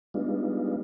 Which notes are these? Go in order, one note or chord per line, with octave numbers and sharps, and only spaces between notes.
G3 G#3 B3 D4 D#4 F4